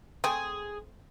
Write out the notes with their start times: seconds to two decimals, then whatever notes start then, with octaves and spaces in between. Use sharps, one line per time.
0.24 A3 C4 G#4